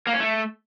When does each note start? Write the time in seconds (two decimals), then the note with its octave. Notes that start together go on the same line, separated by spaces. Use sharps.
0.07 A#3
0.14 C#4
0.20 A3